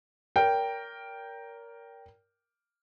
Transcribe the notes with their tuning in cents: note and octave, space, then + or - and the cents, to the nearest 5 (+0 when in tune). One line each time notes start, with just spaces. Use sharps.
A#4 +0 C#5 +45 G5 +0